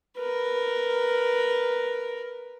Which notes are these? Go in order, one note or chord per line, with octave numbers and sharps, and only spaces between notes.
A#4 B4